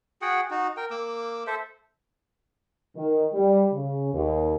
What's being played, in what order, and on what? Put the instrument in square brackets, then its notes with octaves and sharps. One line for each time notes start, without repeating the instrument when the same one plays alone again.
[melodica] F#4 G#4 F#5 G5
D#4 F#4
A#4 G5
A#3 D6 E6
A4 C5 E5
[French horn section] D#3
G3
C#3
D#2